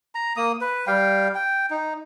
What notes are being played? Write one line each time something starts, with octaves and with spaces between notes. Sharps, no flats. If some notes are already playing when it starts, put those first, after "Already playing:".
A#5
A#3 D#6
B4
G3 F5 G5
G5
D#4